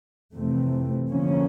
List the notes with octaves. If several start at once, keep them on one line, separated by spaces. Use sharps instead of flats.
F2 C3 E3 A3 C4
D3 F3 A#3 C#4